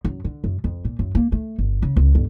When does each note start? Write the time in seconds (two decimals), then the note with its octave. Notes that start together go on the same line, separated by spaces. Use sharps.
0.05 F#2
0.24 D3
0.44 F#2
0.64 F2
0.85 A#2
0.99 F#2
1.15 A#3
1.32 A3
1.59 G1
1.82 C#3
1.96 C#2
2.15 G1